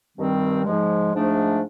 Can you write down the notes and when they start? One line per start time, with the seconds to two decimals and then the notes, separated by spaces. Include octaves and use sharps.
0.17 G2 D#3 G3 C4
0.65 G#2 F3 G#3
1.13 G#2 F3 A3 D4